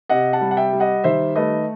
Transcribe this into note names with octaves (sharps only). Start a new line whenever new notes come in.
C3 D#5 F#5
F#5 A5
G3
F#5
E5 G5
G3
D#5 F#5
D#3 C5 E5
A3 B4 D#5